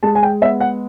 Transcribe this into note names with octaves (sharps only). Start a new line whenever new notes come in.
G#3 A5
G#5
G5
B3 E5
F#5